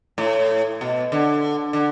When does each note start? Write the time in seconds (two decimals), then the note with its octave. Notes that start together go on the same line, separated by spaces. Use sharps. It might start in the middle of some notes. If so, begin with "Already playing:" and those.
0.18 A2
0.81 B2
1.12 D3
1.73 D3